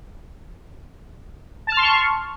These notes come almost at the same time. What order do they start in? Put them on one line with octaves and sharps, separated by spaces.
A5 F6 C6 C#6